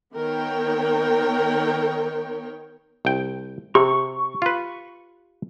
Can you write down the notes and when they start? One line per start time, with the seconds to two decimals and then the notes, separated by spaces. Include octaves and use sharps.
0.14 D#3 B3 A#4 C#5 G5
3.05 C2 G5
3.75 C3 G4 C#6
4.42 F4 B4